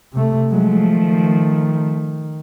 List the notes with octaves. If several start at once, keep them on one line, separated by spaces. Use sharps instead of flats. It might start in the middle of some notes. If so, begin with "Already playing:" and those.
C3 A3
F3 F#3 G#3 A3
D#3